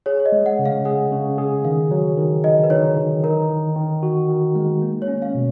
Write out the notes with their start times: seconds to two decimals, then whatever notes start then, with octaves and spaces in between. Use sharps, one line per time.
0.06 G#4 C#5
0.20 C#5
0.26 D#5
0.32 G#3
0.46 F#5
0.59 C#3
0.65 F5
0.85 G#4 F#5
1.11 C#3
1.38 G#4
1.64 D#3 F5
1.91 F#3
2.17 D#3
2.44 D#3 D#5
2.64 B4
2.70 D#4 C#5
2.97 D#3
3.23 D#4 A#4
3.50 D#3
3.76 D#3
4.03 F#4
4.29 D#3
4.55 G#3
4.82 A#3
5.02 C#5
5.08 C#4
5.22 F5
5.35 B2